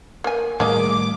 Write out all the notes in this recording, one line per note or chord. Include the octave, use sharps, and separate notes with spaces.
A#3 G#5
A2 D#3 G3 A#3 G#4 D#5 D6